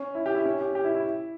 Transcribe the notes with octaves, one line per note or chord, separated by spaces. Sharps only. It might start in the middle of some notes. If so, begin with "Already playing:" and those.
Already playing: C#4
E4
G4
E4
C#4
G4
G4
E4
E4